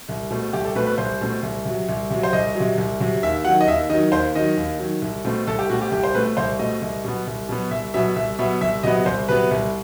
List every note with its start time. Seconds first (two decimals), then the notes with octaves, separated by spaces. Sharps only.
0.09 C2
0.30 B2 A3 C4
0.53 C2 G4
0.64 A4
0.75 B2 A3 C4 B4
0.87 B4
0.98 C2 C5
1.21 B2 A3 C4
1.43 C2
1.65 C3 F#3
1.89 C2
2.10 C3 F#3
2.23 C5
2.33 C2 D#5
2.55 C3 F#3
2.78 C2
3.00 C3 F#3
3.23 D#2 E5
3.45 D#3 F#3 F#5
3.61 D#5
3.67 D#2 E5
3.90 D#3 F#3 D#5
4.12 D#2 C5
4.35 D#3 F#3 D#5
4.57 D#2
4.79 D#3 F#3
5.02 C2
5.24 B2 A3 C4
5.47 C2 A4
5.59 G4
5.70 B2 A3 C4 F#4
5.81 G4
5.91 C2 G4
6.04 C5
6.14 B2 A3 C4 B4
6.37 C2 C5
6.59 B2 A3 C4 D#5
6.82 C2
7.04 B2 F#3 B3
7.27 C2
7.49 B2 F#3 B3
7.71 C2 E5
7.94 B2 F#3 B3 E5
8.16 C2 E5
8.39 B2 F#3 B3 E5
8.61 C2 E5
8.83 C3 F#3 B3 D#5
9.06 C2 C5
9.28 C3 F#3 B3 B4
9.51 C2